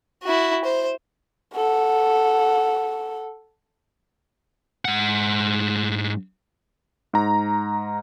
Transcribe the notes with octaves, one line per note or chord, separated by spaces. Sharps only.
E4 F#4
C5
A4 F#5
G#2 F#5
G#2 A#5